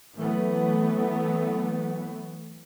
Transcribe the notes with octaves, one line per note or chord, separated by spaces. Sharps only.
E3 F#3 A3 B3